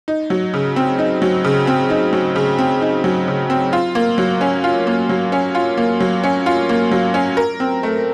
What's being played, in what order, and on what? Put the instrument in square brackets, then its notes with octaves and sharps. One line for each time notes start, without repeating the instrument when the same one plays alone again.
[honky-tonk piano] D#4
F#3
C#3
C4
D#4
F#3
C#3
C4
D#4
F#3
C#3
C4
D#4
F#3
C#3
C4
F4
A#3
F#3
C#4
F4
A#3
F#3
C#4
F4
A#3
F#3
C#4
F4
A#3
F#3
C#4
A#4
C4
A3